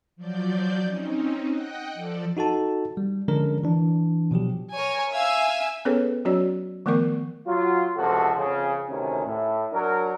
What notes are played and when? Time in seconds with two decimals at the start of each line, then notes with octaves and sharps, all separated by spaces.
0.16 F3 F#3 D5 G6
0.83 C4 C#4 D#4
1.50 D#5 F#5 G5 F#6
1.94 F3 A4 D5
2.37 D#4 F#4 A4 A5
2.97 G3
3.28 D3 F3 G#3 C#4 D4 A#4
3.64 E3 D4
4.31 B2 F3 F#3 G4
4.72 A#4 C#5 G#5
5.12 E5 F5 G#5 E6
5.85 B3 C#4 G#4 A4 B4 C#5
6.25 F#3 C#4 F#4 C#5 D5
6.86 D#3 F3 A3 B3 A#4 C#6
7.47 F#3 F4
7.97 C#2 C3 F3 F#4 A4
8.37 F2 C#3
8.89 D2 C3 D#3 C#4
9.25 A2
9.73 F#3 D4 A#4